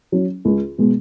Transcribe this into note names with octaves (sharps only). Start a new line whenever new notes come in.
F#3 C#4
C#2
B2 G#3